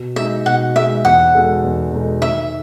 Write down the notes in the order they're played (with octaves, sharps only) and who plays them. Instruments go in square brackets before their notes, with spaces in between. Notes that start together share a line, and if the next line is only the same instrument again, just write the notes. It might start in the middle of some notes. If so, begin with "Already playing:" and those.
Already playing: [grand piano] B2
[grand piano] G#3 D#4 [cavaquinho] E5
[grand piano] B2 [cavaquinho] F#5
[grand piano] G#3 D#4 [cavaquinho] E5
[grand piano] E2 [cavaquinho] F#5
[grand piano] B2 G#3 D#4 A4
E2
B2 G#3 D#4 A4
[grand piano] D#3 [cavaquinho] E5